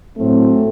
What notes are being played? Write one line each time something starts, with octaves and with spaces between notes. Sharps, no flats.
A2 F#3 A3 C4